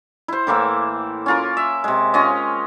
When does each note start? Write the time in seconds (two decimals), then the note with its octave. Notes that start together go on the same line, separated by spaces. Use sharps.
0.28 E4 C5
0.47 A2 E3 A#3 E5
1.26 C#4 F4 A#4
1.57 E5
1.84 C3 G#3
2.14 C#4 F4 D#5